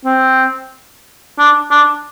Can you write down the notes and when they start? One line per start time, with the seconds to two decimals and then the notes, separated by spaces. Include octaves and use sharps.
0.05 C4
1.39 D4
1.71 D4